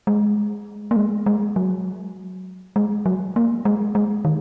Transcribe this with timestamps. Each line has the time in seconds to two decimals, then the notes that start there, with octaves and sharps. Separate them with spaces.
0.07 G#3
0.91 A#3
0.96 G#3
1.26 G#3
1.56 F#3
2.76 G#3
3.06 F#3
3.36 A#3
3.65 G#3
3.95 G#3
4.25 D#3